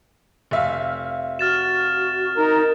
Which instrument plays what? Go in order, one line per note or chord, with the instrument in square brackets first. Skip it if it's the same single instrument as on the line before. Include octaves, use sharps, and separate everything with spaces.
[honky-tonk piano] F1 E5 F5
[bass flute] F#4 [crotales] F6 A6 E7
[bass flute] D#4 [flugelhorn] A#4